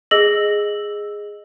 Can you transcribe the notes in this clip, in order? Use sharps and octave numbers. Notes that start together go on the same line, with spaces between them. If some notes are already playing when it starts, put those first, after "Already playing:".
G#4 D#5 E6 A#6 F#7